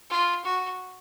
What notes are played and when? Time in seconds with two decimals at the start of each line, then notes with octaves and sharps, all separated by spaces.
0.10 F4
0.44 F#4